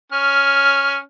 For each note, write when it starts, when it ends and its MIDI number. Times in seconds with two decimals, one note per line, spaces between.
0.12 0.98 61
0.12 0.98 89